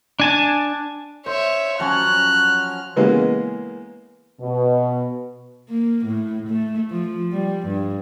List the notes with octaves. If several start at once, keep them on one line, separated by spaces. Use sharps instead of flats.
D4 G#5 A5
C5 C#5 E5
F3 F#3 C#4 F6 F#6
C#3 E3 G#3 A#3 B3
B2
A#3
A2
A3
F3
G3
G2